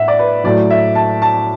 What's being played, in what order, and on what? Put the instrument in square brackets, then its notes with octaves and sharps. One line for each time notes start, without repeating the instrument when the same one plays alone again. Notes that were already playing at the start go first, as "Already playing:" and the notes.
Already playing: [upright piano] A2 E5 F#5
D5
B4
A2 F#3 D5
E5
A5
A5